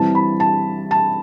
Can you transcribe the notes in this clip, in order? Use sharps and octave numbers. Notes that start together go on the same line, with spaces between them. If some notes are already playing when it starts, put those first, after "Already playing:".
Already playing: E3 G3 C4 E4 A5
B5
A5
A5